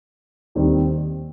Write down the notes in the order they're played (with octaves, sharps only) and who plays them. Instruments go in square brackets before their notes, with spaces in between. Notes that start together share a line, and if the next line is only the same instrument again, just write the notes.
[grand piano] D#2 D#3 G3 C4